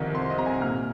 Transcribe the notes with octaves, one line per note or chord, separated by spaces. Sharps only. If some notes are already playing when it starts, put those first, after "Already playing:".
Already playing: C2 D#3 F3
C4 C6
D#5
C3 A#5
G#5
A#2 F6